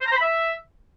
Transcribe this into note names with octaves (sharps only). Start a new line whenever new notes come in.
C5
A#5
C5
B5
E5